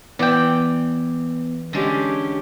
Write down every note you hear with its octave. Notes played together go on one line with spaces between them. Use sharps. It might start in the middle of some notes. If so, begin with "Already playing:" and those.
E3 B3 D5 G5
D3 G#3 C#4 G4